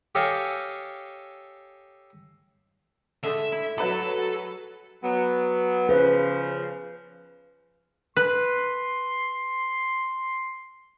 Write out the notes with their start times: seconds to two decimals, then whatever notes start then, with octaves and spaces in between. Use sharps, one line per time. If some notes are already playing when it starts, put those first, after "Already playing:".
0.15 G4 A4 C#5 D#5 F5 G#5
3.23 D3 G#3 A3 E5
3.52 E4
3.78 F#3 A4 B4 B5
5.03 F#3 B3
5.89 C#3 F3 B4
8.17 B4 C6